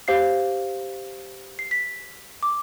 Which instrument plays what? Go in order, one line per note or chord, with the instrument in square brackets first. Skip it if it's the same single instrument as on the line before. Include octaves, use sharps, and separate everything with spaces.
[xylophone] G4 C5 F5 C7
C7
B6
D6